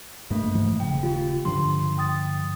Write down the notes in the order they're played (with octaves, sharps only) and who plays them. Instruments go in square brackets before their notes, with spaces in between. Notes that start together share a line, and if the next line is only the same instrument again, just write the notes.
[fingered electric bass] G2 [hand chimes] A3 A#3
[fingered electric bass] G#2 E3 F3
[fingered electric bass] D#1 C#3 [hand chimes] G5
[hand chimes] F4 G4
[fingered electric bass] G2 D3 F3 [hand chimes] C6
[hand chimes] G5 D#6 A6